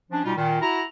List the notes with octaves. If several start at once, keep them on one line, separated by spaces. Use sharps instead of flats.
F3 C#4 D4
B2 G3 D#4 F4
A#2 D#3
E4 F#4 A#5